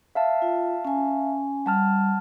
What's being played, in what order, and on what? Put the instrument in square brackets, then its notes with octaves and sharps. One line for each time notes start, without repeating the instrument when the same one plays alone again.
[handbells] E5 F5 A5
[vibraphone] F4
C#4 G#5
[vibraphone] G3 [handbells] F#5 A5 F6